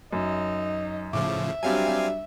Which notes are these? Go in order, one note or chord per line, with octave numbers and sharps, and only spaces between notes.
F#2 D#4
A2 C#3 F3 E5 D6
F#3 G3 C4 D4 F5 G#5